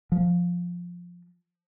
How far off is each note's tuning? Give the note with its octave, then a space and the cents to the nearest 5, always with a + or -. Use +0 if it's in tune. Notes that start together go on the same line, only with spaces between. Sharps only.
F3 +10